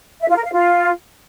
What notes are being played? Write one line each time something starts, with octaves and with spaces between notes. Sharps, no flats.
E5
F4
A#4
F5
F4